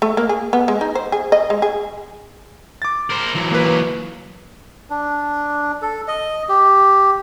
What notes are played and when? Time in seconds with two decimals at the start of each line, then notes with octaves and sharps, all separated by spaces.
0.02 A3
0.17 A#3
0.29 G#4
0.53 B3
0.68 G#3
0.81 D#4
0.95 C5
1.12 G#4
1.32 D#5
1.50 G#3
1.62 G#4
2.82 D6 A6
3.10 A#4 C5
3.35 E3 F#3
3.51 A#3 B4
4.90 D4
5.82 A4
6.08 D#5
6.49 G4